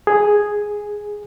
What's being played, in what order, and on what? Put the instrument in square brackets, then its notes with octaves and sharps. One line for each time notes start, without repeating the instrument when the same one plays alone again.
[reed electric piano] G#4